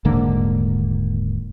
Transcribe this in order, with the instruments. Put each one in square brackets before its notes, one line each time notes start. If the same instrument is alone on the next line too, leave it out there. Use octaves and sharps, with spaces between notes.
[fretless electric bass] D#1 G#2 D3 A#3